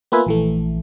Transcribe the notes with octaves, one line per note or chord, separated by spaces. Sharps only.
A#3 B3 F4 B4 E5 G#5
A#1 E3 A3